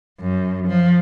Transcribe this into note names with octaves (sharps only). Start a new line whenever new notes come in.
F#2
F3